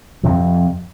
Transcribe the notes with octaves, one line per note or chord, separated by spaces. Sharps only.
F2 C3 F3